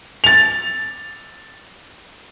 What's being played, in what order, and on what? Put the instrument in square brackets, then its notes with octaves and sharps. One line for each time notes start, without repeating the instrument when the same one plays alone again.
[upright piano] A6 F7